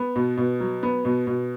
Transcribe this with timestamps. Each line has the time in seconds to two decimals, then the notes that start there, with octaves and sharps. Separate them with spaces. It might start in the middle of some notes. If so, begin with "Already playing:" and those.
Already playing: B3
0.16 B2
0.37 B2
0.60 F#3
0.83 B3
1.05 B2
1.27 B2